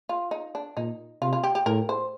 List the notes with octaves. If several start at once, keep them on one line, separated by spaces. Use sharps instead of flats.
F4
D#4
D4
A#2 D#4
C3 F4
F4
G4
G4
A2 A#4
C5